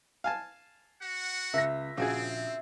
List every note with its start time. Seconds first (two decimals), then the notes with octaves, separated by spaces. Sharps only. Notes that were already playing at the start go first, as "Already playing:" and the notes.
0.24 F5 G#5 A5
1.01 F#4 F#5
1.54 C#2 E5 A#6
1.97 A#1 C#3 C4 F#4 G#4 G#6